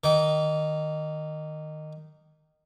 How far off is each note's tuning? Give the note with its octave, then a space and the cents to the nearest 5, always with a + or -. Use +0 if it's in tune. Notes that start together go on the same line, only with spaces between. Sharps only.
D#3 -15 D6 -35